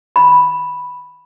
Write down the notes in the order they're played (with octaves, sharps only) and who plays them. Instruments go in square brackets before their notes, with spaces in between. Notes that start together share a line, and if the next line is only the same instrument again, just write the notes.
[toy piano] B5